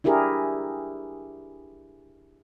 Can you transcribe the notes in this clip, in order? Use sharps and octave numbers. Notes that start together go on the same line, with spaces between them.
D4 E4 G4 G#4 A#4